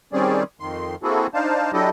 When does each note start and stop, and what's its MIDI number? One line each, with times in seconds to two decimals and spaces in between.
0.13 0.43 51
0.13 0.43 55
0.13 0.43 60
0.13 0.43 61
0.13 0.43 68
0.13 0.43 74
0.60 0.95 41
0.60 0.95 51
0.60 0.95 84
1.03 1.27 58
1.03 1.27 60
1.03 1.27 64
1.03 1.27 66
1.03 1.27 68
1.03 1.27 69
1.34 1.71 62
1.34 1.71 63
1.34 1.71 72
1.34 1.71 77
1.34 1.71 81
1.73 1.90 54
1.73 1.90 62
1.73 1.90 64
1.73 1.90 67
1.73 1.90 69
1.73 1.90 75